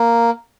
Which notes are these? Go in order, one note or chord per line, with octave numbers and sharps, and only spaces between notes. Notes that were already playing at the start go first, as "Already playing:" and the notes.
Already playing: A#3